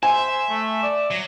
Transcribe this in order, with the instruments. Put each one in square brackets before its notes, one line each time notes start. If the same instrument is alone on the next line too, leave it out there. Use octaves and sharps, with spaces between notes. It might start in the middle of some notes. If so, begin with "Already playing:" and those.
[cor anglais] C5 [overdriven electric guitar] E5 [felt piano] G#5
[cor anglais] A3
D5
[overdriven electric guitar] F#3